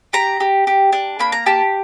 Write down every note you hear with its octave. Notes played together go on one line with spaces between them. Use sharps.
G4 A#5
G4
G4
D4
A#3 B5
A#5
G4 A5